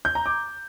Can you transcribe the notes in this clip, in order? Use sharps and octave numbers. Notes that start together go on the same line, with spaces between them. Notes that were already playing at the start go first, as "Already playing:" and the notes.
G6
A#5
D6